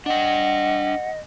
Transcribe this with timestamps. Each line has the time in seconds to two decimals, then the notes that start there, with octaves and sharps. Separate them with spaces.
0.06 D4 D#5 F#5 G5